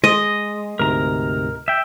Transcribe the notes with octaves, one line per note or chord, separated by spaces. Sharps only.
G#3 D#5 D#6
D2 G#2 C3 A#4 A#5
E5 G5